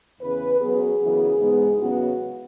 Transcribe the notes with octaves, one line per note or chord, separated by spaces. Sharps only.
E2 C#3 E3 B4
F#2 F#3 B3 G#4
F#2 C#3 E3 B3
G#2 G#3 B3
E2 C#3 F#3 B3 F#4